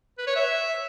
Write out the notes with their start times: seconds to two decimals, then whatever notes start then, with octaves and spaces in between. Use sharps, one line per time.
0.18 B4
0.27 C#5
0.36 E5